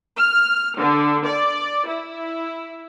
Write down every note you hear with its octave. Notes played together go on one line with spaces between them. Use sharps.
F6
D3
D5
E4